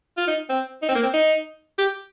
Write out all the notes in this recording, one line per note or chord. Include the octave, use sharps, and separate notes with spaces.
F4
D#4
C4
D#4
C4
A#3
C4
D#4
G4